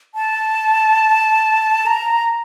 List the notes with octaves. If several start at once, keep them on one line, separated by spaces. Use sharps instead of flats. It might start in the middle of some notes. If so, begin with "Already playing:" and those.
A5
A#5